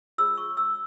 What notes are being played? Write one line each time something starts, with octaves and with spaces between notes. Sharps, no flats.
F4 G#4 C#5 E6
C#6
E6